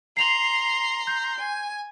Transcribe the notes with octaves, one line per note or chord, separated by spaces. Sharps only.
A#5 C6 C7 F7 F#7
G6
G#5